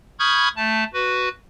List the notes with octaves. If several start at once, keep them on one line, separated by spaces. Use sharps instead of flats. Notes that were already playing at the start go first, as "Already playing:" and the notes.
B5 C#6 D#6 F6 G6 G#6
A3 A5
F#4 B4